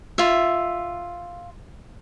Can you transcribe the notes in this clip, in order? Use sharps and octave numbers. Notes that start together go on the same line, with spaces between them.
F4 E5